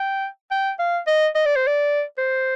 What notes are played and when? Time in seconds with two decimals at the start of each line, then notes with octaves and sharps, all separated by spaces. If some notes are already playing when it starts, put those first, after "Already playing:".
Already playing: G5
0.51 G5
0.79 F5
1.07 D#5
1.35 D#5
1.46 D5
1.56 C5
1.67 D5
2.18 C5